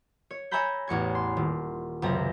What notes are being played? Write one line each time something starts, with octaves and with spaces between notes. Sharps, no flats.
C#5
C#5 E5 G#5 A#5 B5 G6
A1 E2 C#6 G#6
C6
D#1
C#2 F#2 C3 C#4 A#6